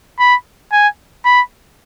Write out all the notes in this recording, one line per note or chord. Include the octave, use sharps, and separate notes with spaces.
B5
G#5
B5